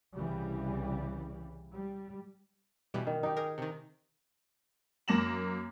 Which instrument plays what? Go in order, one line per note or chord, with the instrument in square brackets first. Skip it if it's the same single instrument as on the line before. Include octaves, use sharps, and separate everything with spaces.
[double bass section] C2 C#3 E3 G3
G3
[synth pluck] B2 E3 G3
[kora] D#3
D#4 G4
[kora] G#4 [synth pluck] A#4
[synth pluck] C3 D#3
[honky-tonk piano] F#2 A#3 A#6 E7 F#7